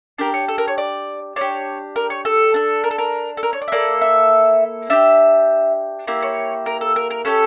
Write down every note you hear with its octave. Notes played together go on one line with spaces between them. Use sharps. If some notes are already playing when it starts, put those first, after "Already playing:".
D4 G4 A#4
C#5
A4
A#4
C#5
D5
D4 G4 C#5
A#4
C#5
A4
D4 A4
A#4
A4
A#4
A4
A#4
C#5
D5
E5
A#3 E4 A4 D5
E5
D4 G4 E5
A#3 E4 G4
C#5
A#4
A4
A#4
A#4
C#4 G4 A4